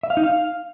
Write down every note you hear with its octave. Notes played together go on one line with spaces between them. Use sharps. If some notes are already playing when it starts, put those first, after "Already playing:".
E5
F5
D#4
F5